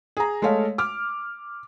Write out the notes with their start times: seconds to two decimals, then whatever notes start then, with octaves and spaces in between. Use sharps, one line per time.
0.17 G#4 A#5
0.42 G#3 A3 A4 C#5 F5
0.78 D6 F6